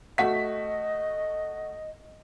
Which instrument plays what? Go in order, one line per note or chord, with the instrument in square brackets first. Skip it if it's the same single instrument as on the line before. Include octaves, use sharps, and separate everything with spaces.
[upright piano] A3 F#4 B6 [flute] D#5